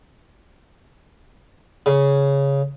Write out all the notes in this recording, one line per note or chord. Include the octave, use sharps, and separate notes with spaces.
C#3